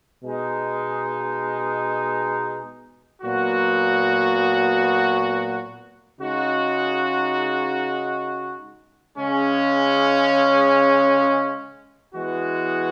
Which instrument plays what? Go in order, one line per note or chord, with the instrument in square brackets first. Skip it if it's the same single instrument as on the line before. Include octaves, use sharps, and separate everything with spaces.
[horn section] B2 G#3 D#4
A#2 F#3 B3 F#4
C#3 G#3 D#4 F#4
C#3 G#3 C#4
E3 G#3 B3 F#4